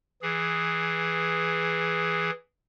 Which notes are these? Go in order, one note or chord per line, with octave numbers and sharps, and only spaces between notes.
E3 G#4